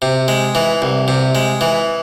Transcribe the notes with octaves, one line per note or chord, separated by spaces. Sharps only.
C3
G#3
E3
C2
C3
G#3
E3